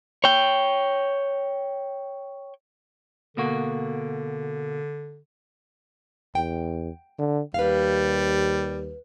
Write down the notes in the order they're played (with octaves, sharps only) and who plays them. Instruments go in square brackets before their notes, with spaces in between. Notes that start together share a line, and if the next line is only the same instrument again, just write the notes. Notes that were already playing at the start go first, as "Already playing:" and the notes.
[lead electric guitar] C#5 G5
[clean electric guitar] B2 A#3 F#4 [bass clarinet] D3
[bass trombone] E2 [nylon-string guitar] G5
[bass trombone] D3
[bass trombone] D#2 [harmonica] G3 [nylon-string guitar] B4 F5